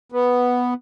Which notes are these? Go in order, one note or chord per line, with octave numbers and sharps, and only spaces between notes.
B3